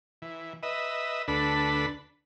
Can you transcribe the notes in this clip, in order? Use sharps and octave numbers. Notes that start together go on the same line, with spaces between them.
E3
B4 D#5 E5
D2 D4 A4 B4 B5